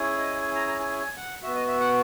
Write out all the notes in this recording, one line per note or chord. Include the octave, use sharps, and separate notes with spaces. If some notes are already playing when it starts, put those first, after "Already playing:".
Already playing: C#4 E4 G#4
D#5
G#5
A#5
A#5
G#5
G#5
F#5
B3 F#4 E5
D#5
E5
F#5